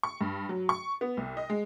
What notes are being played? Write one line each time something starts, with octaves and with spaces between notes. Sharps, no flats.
C#6
G2
F#3
C#6
B3
C2
D#5
G#3